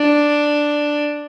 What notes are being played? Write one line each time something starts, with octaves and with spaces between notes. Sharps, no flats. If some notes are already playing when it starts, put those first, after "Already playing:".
Already playing: D4